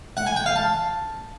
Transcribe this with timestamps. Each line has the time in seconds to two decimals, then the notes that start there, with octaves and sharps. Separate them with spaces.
0.17 F#5
0.27 G#5
0.36 G5
0.46 F5
0.56 A5